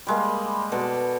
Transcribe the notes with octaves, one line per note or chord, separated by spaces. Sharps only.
G3 G#3 A#3
B2 A4 D5